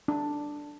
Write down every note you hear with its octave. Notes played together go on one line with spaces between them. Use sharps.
D4